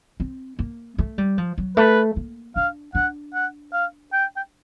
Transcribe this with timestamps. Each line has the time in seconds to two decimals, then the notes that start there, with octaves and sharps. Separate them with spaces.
0.20 C4
0.59 A#3
0.98 A3
1.18 G3
1.38 F3
1.58 F#3
1.77 A3 B4
2.16 A#3
2.56 D4 F5
2.95 D4 F#5
3.34 F#5
3.73 F5
4.13 G5
4.37 G5